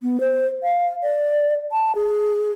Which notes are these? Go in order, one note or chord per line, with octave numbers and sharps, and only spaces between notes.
B3
C5
F5
D5
A5
G#4